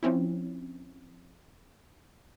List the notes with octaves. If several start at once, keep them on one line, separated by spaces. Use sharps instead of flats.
F3 C4 C#4 E4